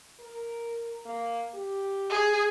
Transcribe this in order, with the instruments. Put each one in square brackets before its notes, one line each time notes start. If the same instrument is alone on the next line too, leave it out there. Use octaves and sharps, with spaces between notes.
[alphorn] A#4
A#3
G4
[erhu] G#4